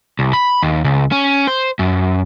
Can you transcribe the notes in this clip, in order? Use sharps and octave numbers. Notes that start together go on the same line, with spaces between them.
C2
B5
D#2
C#2
C#4
C5
F#2